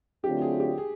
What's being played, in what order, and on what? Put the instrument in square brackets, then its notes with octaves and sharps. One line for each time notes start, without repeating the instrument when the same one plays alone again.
[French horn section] D3 F#3 A3 C4 F4 [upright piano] G4
[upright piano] G#4
G4
G#4